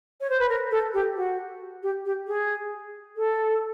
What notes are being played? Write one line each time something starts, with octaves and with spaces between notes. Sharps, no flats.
C#5
C5
B4
A#4
A4
G4
F#4
G4
G4
G#4
A4